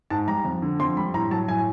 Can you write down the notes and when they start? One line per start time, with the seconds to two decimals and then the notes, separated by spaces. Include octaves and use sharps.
0.10 G#2 A5
0.28 G3 A#5
0.45 F2
0.62 D3
0.80 F2 C6
0.97 G3 B5
1.14 A2 A#5
1.31 F#3 A5
1.48 A2 G#5